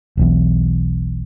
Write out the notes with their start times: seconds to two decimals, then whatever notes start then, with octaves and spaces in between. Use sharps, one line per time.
0.17 E1 B1 E2